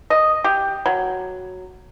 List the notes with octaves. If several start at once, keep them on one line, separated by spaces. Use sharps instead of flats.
D#5
G4
F#3